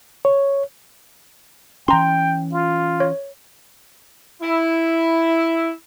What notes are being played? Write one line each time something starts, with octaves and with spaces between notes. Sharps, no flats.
C#5
E3 C#4 G5 A#5 C6
F4
C#5
E4